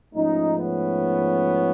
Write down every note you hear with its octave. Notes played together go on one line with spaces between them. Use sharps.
G#2 F3 A3 C#4 D#4
B3 C#4